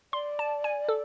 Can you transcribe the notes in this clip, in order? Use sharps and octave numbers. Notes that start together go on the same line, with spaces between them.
D5 C6
A5
G#5
A4